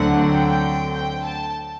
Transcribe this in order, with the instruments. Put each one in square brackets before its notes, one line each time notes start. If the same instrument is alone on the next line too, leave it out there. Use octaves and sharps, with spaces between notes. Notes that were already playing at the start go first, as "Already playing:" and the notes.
Already playing: [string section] D2 D3 F#3 A3 C4 F#5
G5
G5
A5